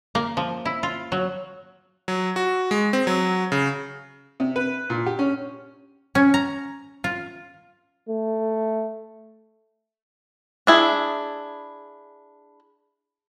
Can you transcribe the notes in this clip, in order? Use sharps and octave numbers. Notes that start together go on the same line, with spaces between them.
A#3
F3
E4
F4
F#3
F#3
F#4
G#3
C4
F#3
C#3
C3
B4
A#2
G4
C#4
C#4
A#5
F4
A3
D4 E4 G#4